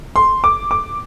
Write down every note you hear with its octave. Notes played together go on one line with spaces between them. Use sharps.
C6
D6
D6